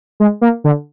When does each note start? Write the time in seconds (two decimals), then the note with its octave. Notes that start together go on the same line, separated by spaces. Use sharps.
0.20 G#3
0.41 A#3
0.64 D3